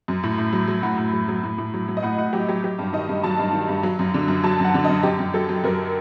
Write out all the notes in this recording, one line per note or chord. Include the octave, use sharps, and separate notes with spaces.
F#2
A2
A2
F#3
F#3
A2 F#5
A2
F#3
F#3
A2
A2
F#3
F#3
D#5
A2 F#5
A2 F#5
F#3 G4
F#3 G4
F#3 G4
G2
D#3 D#5
G2
F#3 A5
G2
D#3
G2
F#3
F#2
D3
F#2
F#3 A5
F#2 F#5
D3
D#5
F#2
F#2 G4
F#2
F#3 A4
F#3
F#2 A#4